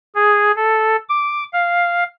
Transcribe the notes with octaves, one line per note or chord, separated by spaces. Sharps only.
G#4
A4
D6
F5